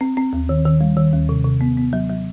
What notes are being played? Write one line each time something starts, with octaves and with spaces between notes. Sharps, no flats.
C4
C4
D#2
D#3
D#3
G3
D#3
D#2
C3
C3
B3
B3
F#3
F#3